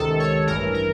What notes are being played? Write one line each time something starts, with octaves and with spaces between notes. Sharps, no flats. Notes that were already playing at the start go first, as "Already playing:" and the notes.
Already playing: C#2 C3 D#3 A4
C#5
A1 G2 E3 A#4
A#4